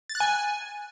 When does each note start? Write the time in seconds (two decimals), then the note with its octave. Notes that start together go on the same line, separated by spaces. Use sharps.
0.10 A6
0.15 F#6
0.20 G#5